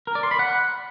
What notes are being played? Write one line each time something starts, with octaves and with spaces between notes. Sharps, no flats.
A#4
D5
C6
B5
F#5